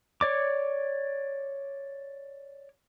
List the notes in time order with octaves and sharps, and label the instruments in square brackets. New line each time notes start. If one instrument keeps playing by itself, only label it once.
[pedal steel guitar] C#5 D5 D6